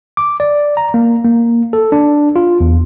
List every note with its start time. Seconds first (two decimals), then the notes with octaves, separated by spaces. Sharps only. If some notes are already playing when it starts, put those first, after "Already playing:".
0.17 D6
0.40 D5
0.77 A#5
0.94 A#3
1.24 A#3
1.73 A4
1.92 D4
2.36 F4
2.60 E2